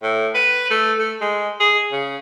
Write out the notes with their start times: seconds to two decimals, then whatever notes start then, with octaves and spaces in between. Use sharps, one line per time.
0.03 A2
0.34 B4
0.70 A3
0.98 A3
1.21 G#3
1.60 G#4
1.92 C#3